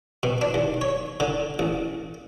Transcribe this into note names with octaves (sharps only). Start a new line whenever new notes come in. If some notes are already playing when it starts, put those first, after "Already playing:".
B2
D4
D#2
C#5
D3
A1